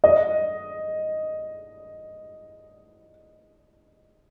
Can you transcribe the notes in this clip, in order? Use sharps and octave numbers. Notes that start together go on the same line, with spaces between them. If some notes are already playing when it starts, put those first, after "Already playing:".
D#5